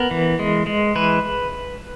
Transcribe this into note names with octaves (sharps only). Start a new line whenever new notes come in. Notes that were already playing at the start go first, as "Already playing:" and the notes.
Already playing: B3 A#4
E3
G#3
G#3
E3 B4